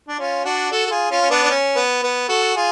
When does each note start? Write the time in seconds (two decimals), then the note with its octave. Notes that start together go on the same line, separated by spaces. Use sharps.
0.08 D4
0.19 C#4 F4
0.45 D4 F#4
0.71 F#4 A4
0.86 A4
0.91 F4 G#4
1.11 C#4 F4
1.21 C#4
1.30 B3 D4
1.43 D4
1.50 C#4
1.76 B3
2.03 B3
2.29 F#4 A4
2.55 F4 G#4